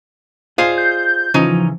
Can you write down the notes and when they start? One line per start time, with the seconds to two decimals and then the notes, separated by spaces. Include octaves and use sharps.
0.58 F4 G#4 C5 D5 D#5 F5
0.78 G6
1.34 C#3 E3 F3 C#4 D#4